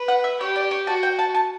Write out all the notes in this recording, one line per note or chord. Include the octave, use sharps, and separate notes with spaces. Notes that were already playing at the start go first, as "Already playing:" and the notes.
Already playing: B4
F#5
E5
G4 C#5
D5
C#5
F#4 A5
G5
A5
A5